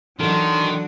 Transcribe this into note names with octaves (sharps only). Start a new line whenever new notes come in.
D#3 E3 F#3 D4 F#4 A4 C6